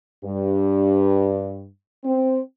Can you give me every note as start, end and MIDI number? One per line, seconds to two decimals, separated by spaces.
0.24 1.67 43
2.04 2.39 60